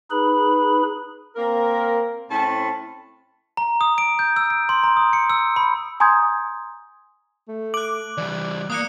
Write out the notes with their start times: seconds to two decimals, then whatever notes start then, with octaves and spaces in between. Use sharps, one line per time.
0.11 D#4 G#4 B4 B5
1.36 A#3 C4 A#4
2.31 A2 C4 C#4 A5 B5
3.57 A#5
3.81 D#6
3.98 D7
4.19 G6
4.36 E6
4.50 D7
4.69 C6
4.84 A#5
4.97 D#6
5.13 C#7
5.30 E6
5.56 B5
6.00 G#5 A#5 C6 D#6 G6 G#6
7.48 A3
7.74 D6 F#6 F#7
8.18 E3 G3 D5
8.70 A#3 D#6 F#6 C#7